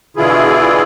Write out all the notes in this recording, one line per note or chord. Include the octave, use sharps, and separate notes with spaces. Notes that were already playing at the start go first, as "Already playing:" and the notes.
B2 D3 E3 E4 F4 G#4